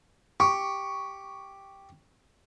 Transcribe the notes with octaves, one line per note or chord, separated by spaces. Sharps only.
G4 C#6